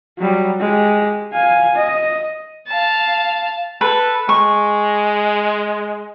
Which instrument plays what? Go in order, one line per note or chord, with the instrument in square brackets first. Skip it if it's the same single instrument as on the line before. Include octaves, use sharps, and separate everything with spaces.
[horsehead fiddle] F#3 G3
G#3 G4
F5 G#5
D#5
[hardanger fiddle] F5 A5
[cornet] A4 [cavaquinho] B4
[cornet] G#3 [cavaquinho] C#6